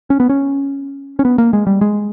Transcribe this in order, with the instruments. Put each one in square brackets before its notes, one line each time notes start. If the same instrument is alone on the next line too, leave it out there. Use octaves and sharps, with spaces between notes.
[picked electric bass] C#4
B3
C#4
C#4
B3
A#3
G#3
G3
G#3